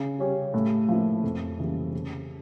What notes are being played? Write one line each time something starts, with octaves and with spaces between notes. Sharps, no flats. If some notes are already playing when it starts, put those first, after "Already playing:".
Already playing: C#3
G3 C#4 G4
A2
F3 A#3 E4
F2
C#3 E3 G3 A#3
C#3